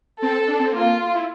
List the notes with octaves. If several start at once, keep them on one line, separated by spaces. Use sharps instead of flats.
C4 A4
D4
C4
A#3 F4
E4